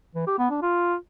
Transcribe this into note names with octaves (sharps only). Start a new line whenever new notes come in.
E3
G4
B3
D4
F4